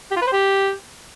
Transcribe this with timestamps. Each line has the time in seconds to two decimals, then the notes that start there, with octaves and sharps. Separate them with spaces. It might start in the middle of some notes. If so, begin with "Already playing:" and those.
0.11 G4
0.17 F4
0.22 B4
0.27 C5
0.32 G4